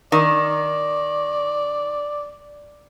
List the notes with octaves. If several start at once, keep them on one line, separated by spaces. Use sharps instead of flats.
D#3 D5